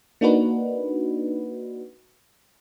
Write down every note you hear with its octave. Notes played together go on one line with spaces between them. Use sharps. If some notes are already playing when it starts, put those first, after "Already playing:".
A#3 D4 D#4 F#4 B4